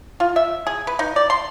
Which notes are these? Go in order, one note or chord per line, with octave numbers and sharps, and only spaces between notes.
F4
E5
G#4
B4
D#4
D5
C6